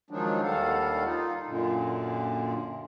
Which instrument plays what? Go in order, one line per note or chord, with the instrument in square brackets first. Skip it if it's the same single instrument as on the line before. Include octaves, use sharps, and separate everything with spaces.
[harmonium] D#3 F3 F#3 G#3 D4 D#4
D#2 D#3 G3 A4 F5 F#5
D#4 F4
F#2 A#2 D3